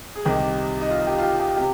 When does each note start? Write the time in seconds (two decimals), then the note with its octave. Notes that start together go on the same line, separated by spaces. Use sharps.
0.16 G#4
0.25 C2 C3 D#3 G4
0.81 D#4
0.90 F4
1.07 G4
1.18 F4
1.23 G4
1.40 G4
1.57 C3 G4